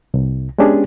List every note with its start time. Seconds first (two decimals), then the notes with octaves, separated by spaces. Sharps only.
0.14 C2
0.58 G#3 B3 C#4 D4 G4 G#4